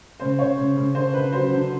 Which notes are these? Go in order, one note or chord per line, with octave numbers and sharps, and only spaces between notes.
C#3 C5
C#3 C#5
C#3
C#3
D3 C5
D3 B4
F#3 C5
D3